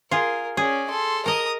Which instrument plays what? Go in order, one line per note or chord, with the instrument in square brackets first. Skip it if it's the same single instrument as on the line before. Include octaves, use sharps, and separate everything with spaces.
[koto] F4 G#4 [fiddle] A#4
[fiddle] C#4 D5 [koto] G#4
[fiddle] A4 C6
[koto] A#4 D#5 [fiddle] A#5 D#6